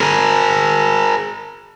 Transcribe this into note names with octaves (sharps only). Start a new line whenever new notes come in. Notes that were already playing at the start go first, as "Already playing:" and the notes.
G#4 A#4